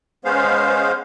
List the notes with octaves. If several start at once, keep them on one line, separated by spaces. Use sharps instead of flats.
G#3 B3 C#4 C5 F5